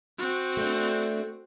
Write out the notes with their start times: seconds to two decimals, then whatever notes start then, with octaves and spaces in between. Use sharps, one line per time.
0.18 C4 F#4
0.57 A3 D4